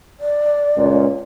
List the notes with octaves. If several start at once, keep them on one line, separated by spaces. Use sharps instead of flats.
D5
C#2 A#2